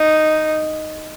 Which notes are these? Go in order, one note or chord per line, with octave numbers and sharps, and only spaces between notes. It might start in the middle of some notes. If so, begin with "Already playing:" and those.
Already playing: D#4